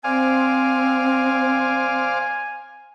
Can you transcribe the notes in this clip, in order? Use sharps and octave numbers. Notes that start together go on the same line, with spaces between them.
C4 C5 D5 F5 G#5